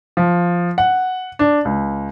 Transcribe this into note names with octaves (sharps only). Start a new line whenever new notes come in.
F3
F#5
D4
C#2